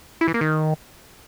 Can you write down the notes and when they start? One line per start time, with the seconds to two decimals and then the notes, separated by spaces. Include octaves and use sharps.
0.21 E4
0.28 E3
0.34 A#3
0.41 D#3